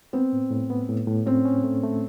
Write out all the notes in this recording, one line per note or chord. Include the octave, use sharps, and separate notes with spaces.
B3 C4
A2
A2
B3
A2
A2
C4 C#4
C#4
A3
A3